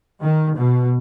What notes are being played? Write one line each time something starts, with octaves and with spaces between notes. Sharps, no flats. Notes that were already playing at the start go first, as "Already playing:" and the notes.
D#3
B2